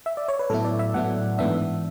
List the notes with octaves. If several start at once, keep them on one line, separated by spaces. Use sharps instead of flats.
E5
D5
C#5
B4
A2 F#3 B3 E4 A4
D5
E5
A2 F#3 B3 E4 F#5
G#2 E3 B3 D4 E5